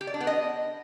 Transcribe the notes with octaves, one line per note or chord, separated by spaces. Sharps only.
G4
D5
D4
B3
D#5